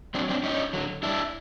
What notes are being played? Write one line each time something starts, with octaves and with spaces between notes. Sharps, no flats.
F#3 C4 D4
C4 D4
F#2 C#4 D#4
D3 F#3
G2 D4 E4